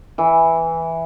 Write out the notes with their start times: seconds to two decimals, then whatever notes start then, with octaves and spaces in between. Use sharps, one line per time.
0.18 E3